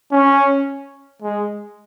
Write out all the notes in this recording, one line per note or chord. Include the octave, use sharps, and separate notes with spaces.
C#4
G#3